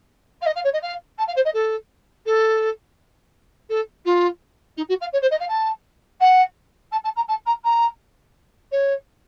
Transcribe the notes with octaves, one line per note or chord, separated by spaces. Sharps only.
F5
D#5
F5
C#5
D#5
F5
A5
F5
C5
D#5
A4
A4
A4
F4
D#4
F#4
F5
C#5
C5
D#5
F5
A5
F#5
A5
A5
A#5
A5
A#5
A#5
C#5